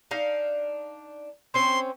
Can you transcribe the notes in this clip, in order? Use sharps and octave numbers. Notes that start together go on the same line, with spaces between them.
D4 D#4 F5
C4 C#4 C5 C6